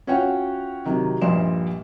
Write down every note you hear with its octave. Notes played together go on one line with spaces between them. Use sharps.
C#4 F4 F#4 C#5 F#5 G5
C3 D#3 F#3
A#1 G2 A#2 D#5 C6 E7